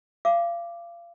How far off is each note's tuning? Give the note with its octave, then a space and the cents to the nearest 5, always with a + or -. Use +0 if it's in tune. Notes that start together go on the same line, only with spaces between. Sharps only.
F5 -30 D6 +0